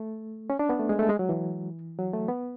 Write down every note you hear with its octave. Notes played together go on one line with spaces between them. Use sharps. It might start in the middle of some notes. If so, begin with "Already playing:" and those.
Already playing: A3
C#4
D4
B3
A3
G#3
A3
G#3
F#3
E3
F#3
A3
B3